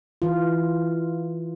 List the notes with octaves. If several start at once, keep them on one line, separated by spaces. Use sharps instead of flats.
E3 F4